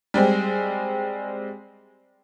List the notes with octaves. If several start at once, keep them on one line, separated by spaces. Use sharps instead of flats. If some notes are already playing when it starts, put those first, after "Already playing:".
G3 G#3 C4